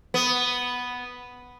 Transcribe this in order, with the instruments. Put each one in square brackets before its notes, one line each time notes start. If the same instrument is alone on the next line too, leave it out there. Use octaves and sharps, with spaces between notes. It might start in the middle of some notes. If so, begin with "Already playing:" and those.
[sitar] B3